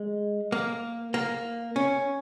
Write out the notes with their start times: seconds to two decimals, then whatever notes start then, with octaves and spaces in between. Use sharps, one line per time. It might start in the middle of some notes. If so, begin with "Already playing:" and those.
Already playing: G#3
0.52 A#3
1.14 A#3
1.76 C#4